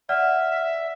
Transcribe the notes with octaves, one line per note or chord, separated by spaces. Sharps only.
D5 E5 F#5 F6